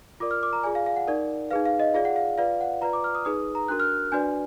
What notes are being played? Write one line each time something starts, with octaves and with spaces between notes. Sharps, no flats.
F4 A#4 D5 D6
F6
D6
A#5
F4 G#4 D5 G#5
F5
F5
F#5
D#4 A#4 D5
D#4 G#4 B4 F5
F5
D#5
F4 G#4 D5 F5
F#5
F5
F4 B4 D5 F5
F#5
F4 B4 D5 A#5
D6
F6
D#6
D#4 G#4 B4 D#6
A#5
D4 F#4 A#4 F#6
F6
D4 F#4 B4 D5 G#5